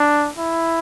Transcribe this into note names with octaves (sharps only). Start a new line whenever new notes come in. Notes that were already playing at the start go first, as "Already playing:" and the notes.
Already playing: D4
E4